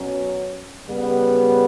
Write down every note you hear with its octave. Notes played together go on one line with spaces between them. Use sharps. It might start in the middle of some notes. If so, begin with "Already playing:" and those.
Already playing: B2 F#3 C#4
C#3 G3 B3